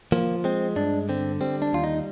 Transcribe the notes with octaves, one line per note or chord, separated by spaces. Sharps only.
F3 A#3
G#3 C4
G2 D4
D3 C4
G3 C4
D4
D#2 F4
D#4